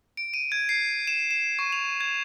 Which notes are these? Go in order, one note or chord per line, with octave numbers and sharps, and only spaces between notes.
D7
D#7
G#6
C7
E7
E7
C#6
F7
G#6